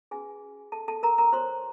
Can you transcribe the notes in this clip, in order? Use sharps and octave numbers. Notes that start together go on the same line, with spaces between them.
C#4 F#4 G#4 B4 G#5
A4 A5
A4 A5
A#4 A#5
A#4 A#5
F#4 A#4 C5 C#5 C6